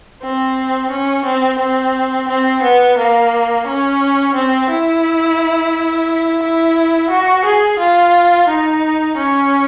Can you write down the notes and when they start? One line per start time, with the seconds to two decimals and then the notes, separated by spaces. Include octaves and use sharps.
0.22 C4
0.90 C#4
1.25 C4
1.59 C4
2.28 C4
2.62 B3
2.98 A#3
3.66 C#4
4.35 C4
4.70 E4
6.42 E4
7.10 F#4
7.45 G#4
7.79 F4
8.48 D#4
9.17 C#4